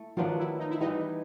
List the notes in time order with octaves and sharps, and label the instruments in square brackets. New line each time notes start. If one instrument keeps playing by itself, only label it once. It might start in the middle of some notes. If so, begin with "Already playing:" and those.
Already playing: [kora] A3 [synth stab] E4
[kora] D#3 F#3 B3 D4 [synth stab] F3 F4
[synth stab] E4
D#4
E4
[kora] E3 G3 B3 [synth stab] D#4